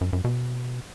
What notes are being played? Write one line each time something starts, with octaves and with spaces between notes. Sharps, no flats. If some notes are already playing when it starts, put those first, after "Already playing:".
F#2
F#2
B2